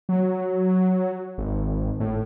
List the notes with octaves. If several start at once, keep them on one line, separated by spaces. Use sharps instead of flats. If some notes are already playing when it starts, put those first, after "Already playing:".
F#3
G#1
A2